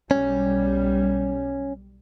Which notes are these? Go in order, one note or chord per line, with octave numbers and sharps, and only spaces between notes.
B1 G3 C#4